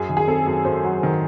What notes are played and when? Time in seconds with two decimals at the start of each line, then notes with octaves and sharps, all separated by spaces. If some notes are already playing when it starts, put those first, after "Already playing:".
Already playing: F#2 G#4
0.09 D#3
0.17 G#4
0.27 C4 A4
0.46 F#2
0.65 F#2 C5
0.84 F#3
1.03 D#3